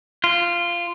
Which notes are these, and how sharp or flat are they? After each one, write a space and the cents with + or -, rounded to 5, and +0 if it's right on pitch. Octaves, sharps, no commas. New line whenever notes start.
F4 -15